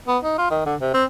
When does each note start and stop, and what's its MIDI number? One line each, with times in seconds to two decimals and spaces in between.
0.08 0.18 59
0.23 0.37 63
0.38 0.48 65
0.50 0.64 51
0.66 0.75 50
0.81 0.93 48
0.94 1.05 60